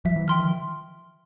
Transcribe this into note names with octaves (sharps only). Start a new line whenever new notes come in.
F3 G3 E5
E3 F#3
D#3 F3 G5 C6 F6
D#3 F3